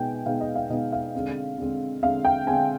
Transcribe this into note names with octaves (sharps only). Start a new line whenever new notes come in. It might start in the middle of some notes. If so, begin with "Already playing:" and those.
Already playing: B2 G#3 B3 D#4 G5 G#5
B2 G#3 B3 D#4 F5
D#5
F5
B2 G#3 B3 D#4 D#5
F5
D3 G#3 C4
D3 G#3 C4
D3 G#3 C4 F5
G5
D3 G#3 C4 G#5